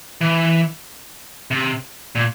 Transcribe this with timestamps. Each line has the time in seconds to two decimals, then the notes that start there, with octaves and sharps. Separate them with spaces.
0.21 E3
1.51 C3
2.15 A#2